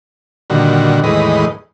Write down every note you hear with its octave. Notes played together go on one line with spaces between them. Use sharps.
A#2 D3 D#3 G3 F#4
E2 A2 D#3 G#3 B4 D#5